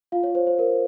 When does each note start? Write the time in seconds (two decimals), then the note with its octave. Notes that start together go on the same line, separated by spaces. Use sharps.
0.12 F4 F5
0.23 C#5
0.35 C5
0.47 C5
0.59 A#4